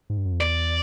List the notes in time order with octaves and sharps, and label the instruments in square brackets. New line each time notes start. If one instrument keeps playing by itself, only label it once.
[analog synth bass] G#2
G2
F#2
F2
[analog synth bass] E2 [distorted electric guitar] D5